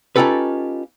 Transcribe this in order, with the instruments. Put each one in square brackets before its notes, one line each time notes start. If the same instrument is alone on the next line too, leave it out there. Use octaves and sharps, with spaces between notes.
[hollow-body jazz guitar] C#4 D#4 F4 G4 A4 B4